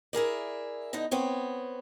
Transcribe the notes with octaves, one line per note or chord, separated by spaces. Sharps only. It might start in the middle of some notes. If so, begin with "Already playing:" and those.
E4 G#4 A#4 D5
D3 B3 D#4 D#5
B3 C4 C#5